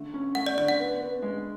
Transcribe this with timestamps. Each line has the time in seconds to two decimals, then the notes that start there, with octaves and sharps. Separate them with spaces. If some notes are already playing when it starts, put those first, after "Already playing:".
Already playing: D3 A3
0.14 C#4
0.35 A3 F#5
0.46 D5
0.57 D3 D5
0.68 F#5
0.79 B3
1.00 B3
1.22 G#3